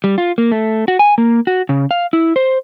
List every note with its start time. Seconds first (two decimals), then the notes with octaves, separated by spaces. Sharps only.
0.04 G3
0.18 F4
0.38 A#3
0.52 A3
0.88 F#4
0.99 G#5
1.18 A#3
1.47 F#4
1.69 C#3
1.91 F5
2.13 E4
2.36 C5